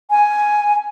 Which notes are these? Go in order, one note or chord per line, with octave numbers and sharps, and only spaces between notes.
G#5